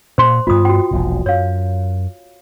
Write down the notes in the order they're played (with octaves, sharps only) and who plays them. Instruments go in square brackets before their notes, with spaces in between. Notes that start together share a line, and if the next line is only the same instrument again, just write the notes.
[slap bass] A#2 [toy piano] C5 C6
[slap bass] G2 G3 B3 [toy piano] F4 D#6
[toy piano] F#4 G5
[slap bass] E1 A#1 A#2
[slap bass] F#2 [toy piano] C#5 F5